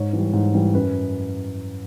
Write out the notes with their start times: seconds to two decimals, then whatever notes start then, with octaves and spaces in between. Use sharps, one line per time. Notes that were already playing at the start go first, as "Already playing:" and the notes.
Already playing: G#2 C#5
0.13 E3 G3
0.33 G#2
0.54 E3 G3
0.74 F#2 B4